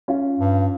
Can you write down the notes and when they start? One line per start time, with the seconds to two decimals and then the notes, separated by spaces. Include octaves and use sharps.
0.08 C#4 F4
0.39 G2